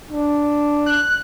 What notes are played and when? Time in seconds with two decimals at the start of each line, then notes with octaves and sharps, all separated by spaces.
0.11 D4
0.86 F#6